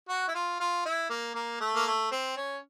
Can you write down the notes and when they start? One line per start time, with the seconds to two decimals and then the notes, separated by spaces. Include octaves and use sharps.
0.09 F#4
0.28 E4
0.35 F4
0.60 F4
0.85 E4
1.10 A#3
1.35 A#3
1.60 A3
1.75 A#3
1.86 A3
2.11 C4
2.36 C#4